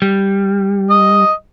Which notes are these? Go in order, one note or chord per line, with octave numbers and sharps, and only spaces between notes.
G3
D#5